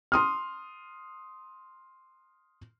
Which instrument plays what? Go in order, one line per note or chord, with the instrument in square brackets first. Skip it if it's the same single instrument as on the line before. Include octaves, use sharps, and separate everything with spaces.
[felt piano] C6 D#6 F6